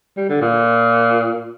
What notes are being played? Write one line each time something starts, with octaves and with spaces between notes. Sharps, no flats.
G3
D3
A#2